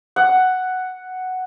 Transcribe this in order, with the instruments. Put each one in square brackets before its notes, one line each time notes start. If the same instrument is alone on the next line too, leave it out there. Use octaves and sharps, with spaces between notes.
[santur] F#5